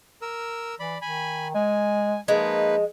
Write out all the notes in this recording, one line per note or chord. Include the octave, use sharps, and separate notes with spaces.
A#4 E6
E3 D5 B5
D#3 G#5 B5
G#3 G#5
F3 G#3 A#3 D#4 B4